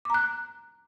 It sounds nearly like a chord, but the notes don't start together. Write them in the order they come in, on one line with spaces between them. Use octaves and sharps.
D6 A#5 F#6